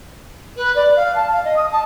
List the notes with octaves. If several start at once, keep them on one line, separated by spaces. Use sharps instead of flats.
B4
D5
F5
A5
F5
D#5
D#6
A5